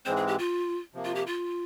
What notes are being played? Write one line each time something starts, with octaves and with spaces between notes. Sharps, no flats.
G#2 E3 G#3 C4 C5
G#4
G4
F4
C3 F3 A#3
F4
G4
F4